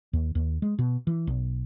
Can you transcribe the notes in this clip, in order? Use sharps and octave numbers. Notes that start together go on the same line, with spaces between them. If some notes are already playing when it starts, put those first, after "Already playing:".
D#2
D#2
G#3
B2
E3
B1